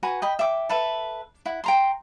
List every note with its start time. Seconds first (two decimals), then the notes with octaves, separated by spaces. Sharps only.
0.03 F#4 B4 G#5 A#5
0.22 D#5 G5 B5
0.39 E5 G5 D6
0.69 A4 B4 E5
1.46 E4 F#5
1.64 G5 A#5 C6